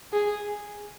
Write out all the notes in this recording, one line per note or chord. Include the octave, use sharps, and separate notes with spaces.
G#4